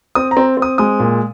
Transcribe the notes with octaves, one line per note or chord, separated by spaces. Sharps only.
C4 D#6
A#5
C4
C4
D#6
G#3 D#6
A#2